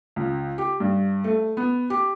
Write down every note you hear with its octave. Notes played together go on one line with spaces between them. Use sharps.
C#2
G4
G2
A3
B3
G4